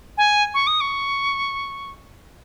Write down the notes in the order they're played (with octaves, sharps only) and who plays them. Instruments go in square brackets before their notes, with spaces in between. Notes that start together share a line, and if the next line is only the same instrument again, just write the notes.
[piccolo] G#5
C#6
D#6
C#6